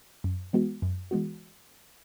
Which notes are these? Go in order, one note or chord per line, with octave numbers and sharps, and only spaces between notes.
F#2
E3 G#3 B3 F#4
F#2
E3 G#3 B3 F#4